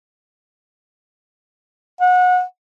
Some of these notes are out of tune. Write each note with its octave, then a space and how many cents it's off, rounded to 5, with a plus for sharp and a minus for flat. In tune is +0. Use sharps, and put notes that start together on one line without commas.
F#5 -25